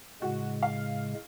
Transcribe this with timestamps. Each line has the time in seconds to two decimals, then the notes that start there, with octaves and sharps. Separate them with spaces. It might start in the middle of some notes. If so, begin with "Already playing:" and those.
0.22 A2 C#3 G#3 F#4
0.62 F5